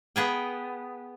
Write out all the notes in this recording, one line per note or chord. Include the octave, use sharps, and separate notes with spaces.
B3 G#4 G5